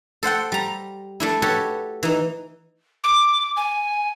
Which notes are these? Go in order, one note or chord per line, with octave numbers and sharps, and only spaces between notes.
A4 C5 F#5 G5
G3 A#5
A3 D4 E4
F#4 G4 A4 B4 C#5
E3 D#4
D6
G#5